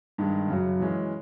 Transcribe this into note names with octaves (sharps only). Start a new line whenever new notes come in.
G2 D#3 G#3
F#2 C#3 F#3
E3 G#3 C#4